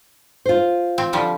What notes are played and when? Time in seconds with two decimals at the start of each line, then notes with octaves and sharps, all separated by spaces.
0.46 F4 C5
0.98 C4
1.13 D3 F3 G3